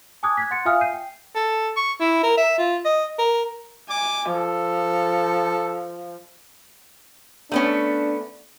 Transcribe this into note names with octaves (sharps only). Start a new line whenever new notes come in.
G#5 A5 D6 D#6 F#6 G#6
F#6 G#6 B6
F#5 C6 F#6 A6 C#7
F4 E5 F5 G#5 D#6 F6
G6 C7 D#7
G5
A4
C#6
E4
A#4
E5
F4
D#5
A#4
G#5 D6
F3 A4
A3 B3 C#4 D4